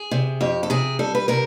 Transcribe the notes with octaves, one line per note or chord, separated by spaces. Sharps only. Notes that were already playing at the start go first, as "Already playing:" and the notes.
Already playing: G#4
C3
F2 G4
A4
C3 G#4
G3 A4
B4
C3 A#4